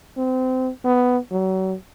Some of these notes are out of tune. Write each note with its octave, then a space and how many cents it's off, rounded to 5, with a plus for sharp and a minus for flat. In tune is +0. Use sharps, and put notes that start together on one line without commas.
C4 -25
B3 +10
F#3 +35